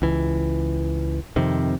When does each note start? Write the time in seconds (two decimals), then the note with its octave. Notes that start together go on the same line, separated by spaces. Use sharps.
0.02 C#2 E3
1.36 F2 C3 D#3